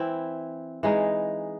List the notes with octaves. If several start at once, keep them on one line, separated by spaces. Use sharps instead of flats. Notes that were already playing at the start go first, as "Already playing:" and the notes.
Already playing: E3 C4 E4
E3 G#3 D#4